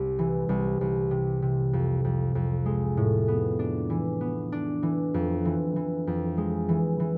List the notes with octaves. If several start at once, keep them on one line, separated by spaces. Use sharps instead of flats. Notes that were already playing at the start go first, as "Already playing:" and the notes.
Already playing: C2
E3
C2
C2
C3
C3
F2
F2
F2
G#3
A2
B3
D4
E3
B3
D4
E3
F2
E3
E3
F2
G#3
E3
E3